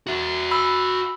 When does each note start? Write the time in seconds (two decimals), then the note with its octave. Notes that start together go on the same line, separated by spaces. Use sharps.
0.07 F#4 E5
0.51 B5 E6